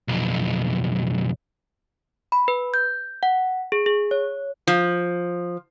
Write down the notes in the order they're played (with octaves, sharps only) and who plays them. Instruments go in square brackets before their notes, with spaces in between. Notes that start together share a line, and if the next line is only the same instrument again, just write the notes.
[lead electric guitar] B1 F2
[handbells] B5
B4
G6
F#5
G#4
G#4
C#5
[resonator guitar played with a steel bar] F3